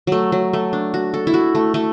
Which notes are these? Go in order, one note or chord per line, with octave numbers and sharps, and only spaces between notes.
F#3 A3
F#3
A3
D4
F#4
A4
E4
F#4
A3
A3